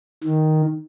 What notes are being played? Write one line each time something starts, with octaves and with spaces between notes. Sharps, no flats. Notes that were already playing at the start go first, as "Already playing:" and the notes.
D#3